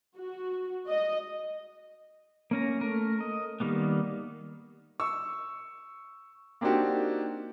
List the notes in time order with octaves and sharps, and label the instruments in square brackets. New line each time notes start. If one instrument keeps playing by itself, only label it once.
[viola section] F#4
D#5
[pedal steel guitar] A#3 C#4 A#5
A3 A#4
D#5
D#3 G3 A#3 B3
[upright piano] C#6 E6
A#3 C4 D4 D#4 F#4 G4